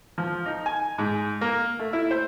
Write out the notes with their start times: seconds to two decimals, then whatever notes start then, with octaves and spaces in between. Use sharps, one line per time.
0.18 F3
0.46 D#4
0.66 G#5
0.98 G#2
1.41 A#3
1.79 A3
1.93 E4
2.11 C5